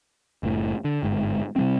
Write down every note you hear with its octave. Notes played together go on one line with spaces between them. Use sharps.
F#1 A2
D3
G1 G#2
C3 G3 C4